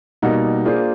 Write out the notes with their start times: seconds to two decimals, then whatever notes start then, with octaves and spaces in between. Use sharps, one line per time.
0.22 B2 G3 A#3 D#4 F#4
0.65 A#3 D4 F4 G#4 C5